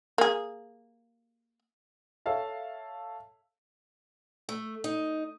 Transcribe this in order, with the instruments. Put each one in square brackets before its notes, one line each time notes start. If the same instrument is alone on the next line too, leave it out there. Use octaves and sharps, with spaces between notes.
[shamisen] A#3 G#4
[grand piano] A4 C#5 E5 F5 A5
[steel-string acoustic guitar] A3
D#4